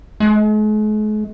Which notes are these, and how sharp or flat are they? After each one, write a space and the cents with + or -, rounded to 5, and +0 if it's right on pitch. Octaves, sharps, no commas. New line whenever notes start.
G#3 +45